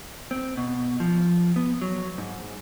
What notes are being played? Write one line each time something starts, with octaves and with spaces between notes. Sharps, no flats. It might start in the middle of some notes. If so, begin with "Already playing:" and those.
C4
B2
F3
B3
F#3
G#2